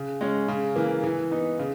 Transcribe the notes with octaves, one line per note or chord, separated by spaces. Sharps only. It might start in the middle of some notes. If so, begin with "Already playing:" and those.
Already playing: C#3
G#3 C#4
C#3
E3 A#3
E3
B3 D#4
C#3